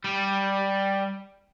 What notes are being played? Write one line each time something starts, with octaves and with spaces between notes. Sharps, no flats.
G3